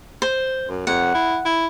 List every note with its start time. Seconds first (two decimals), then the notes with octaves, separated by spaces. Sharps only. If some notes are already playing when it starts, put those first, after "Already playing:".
0.22 C5
0.69 F#2
0.87 F2 F#5
1.15 E4
1.45 E4